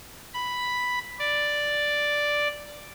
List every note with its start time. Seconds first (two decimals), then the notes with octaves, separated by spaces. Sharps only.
0.34 B5
1.19 D5